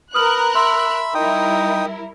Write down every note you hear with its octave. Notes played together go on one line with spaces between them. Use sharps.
A#4 B4 D#6 F6 F#6 F#7
E5 B5 C6 E6
G3 D#4 E4 A#4 G5 D#6